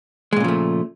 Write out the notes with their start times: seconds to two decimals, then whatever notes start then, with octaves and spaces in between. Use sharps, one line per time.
0.33 G#3
0.36 A#2
0.40 C#3
0.44 F3
0.48 A3